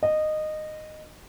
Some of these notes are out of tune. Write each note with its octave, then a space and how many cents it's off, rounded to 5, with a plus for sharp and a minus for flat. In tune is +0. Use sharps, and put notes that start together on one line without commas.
D#5 -15